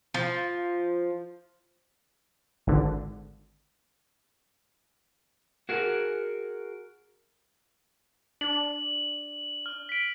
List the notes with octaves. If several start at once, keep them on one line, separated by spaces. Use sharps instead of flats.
F3
G#1 D3
F#4 G#4 A#4
D4 F#7
F6
B6 D7